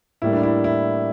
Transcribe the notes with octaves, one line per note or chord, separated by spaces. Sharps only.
A2 G3 A#3 E4
D4
E4
E4